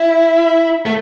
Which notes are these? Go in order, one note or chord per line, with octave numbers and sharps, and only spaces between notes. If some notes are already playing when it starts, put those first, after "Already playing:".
Already playing: E4
A3